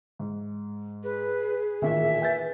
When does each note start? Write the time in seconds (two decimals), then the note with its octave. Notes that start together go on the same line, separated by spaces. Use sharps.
0.19 G#2
1.04 G#4 B4
1.82 A1 A#2 D#3 E5
2.22 B4 G#5 G6 A6